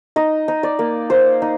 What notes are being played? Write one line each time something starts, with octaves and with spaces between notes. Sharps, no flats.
D#4 D#5
D#4
D5
A#3
A#3 C5
D#4